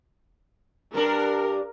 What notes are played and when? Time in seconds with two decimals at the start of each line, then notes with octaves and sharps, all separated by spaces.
0.94 G2 D4 A#4